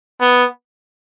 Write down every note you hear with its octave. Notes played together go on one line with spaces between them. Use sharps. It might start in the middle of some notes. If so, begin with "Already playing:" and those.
B3